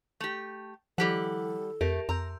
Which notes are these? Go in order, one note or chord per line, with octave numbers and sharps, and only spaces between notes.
A3 G4
D#3 F3 G3 E4 G4 A4 F#5
F2 A3 G4 A#4
F2 A#5 C6 E6 G6